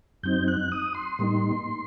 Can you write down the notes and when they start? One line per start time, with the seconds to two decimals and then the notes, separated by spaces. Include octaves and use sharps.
0.23 F#2 F#3 C4 D#4 G6
0.48 F#6
0.72 D#6
0.95 C6
1.19 A2 G3 A#3 D#4